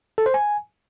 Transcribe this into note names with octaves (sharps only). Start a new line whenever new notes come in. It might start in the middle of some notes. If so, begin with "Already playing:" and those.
A4
C5
G#5